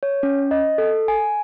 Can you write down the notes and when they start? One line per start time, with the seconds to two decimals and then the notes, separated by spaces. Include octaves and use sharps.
0.03 C#5
0.23 C#4
0.51 D#5
0.78 A4
1.08 G#5